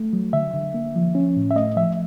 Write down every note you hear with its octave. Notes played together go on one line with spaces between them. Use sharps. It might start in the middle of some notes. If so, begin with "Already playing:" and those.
Already playing: A3
F#3
D3 E5
D3
A#3
F3
C#4
A2
E5
A3 D#5
F3 E5